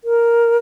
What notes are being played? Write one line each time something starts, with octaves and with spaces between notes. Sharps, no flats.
A#4